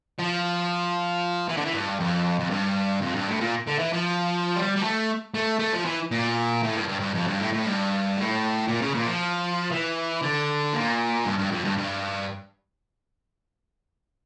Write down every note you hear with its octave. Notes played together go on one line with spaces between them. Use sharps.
F3
E3
D3
E3
G2
F2
F2
G2
F2
G2
A2
A#2
D3
E3
F3
G3
G3
A3
A3
A3
F3
E3
A#2
A2
G2
G2
G2
F2
G2
A2
A2
G2
A2
A#2
C#3
A#2
F3
E3
D3
A#2
G2
G2
F2
G2
G2